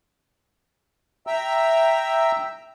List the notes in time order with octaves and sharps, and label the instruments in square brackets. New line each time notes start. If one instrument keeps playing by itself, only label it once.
[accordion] E5 G5 A#5 E6